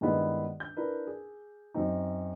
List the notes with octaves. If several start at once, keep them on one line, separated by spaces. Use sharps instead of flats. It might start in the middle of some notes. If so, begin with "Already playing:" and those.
G2 D#3 G#3 B3 E4
G6
D4 E4 A#4 B4
G#4
F#2 F#3 C4 D#4